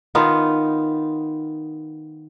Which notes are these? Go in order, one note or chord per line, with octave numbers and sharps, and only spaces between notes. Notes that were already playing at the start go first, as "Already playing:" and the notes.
D#3 B3 D#4 F4